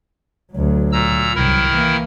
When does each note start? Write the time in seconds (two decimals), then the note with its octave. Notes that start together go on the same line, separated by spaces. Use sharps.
0.52 D2 F#3
0.92 A#2 A#5 E6
1.35 C2 F#2 D#3 E4 A#4
1.70 E3 A#3